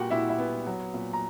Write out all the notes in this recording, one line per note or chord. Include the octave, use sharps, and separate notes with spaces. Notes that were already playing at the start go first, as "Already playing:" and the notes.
Already playing: A#2 G3 F#4 G4 A#4 F#5 G5
A#2 E4 E5
E4 E5
B3
F#3
A#2
A#5